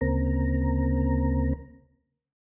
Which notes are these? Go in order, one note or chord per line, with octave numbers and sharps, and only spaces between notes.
D2 C#3 A#3 C4 A#5